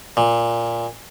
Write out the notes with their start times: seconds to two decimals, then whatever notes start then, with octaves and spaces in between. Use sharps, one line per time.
0.17 A#2